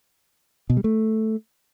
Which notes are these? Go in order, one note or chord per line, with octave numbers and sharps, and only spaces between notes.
B2
G3
A3